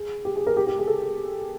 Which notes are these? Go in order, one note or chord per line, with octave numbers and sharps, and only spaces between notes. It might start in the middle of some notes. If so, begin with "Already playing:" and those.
Already playing: G#4
G4
G#4
A#4
G4
G4
G#4
A4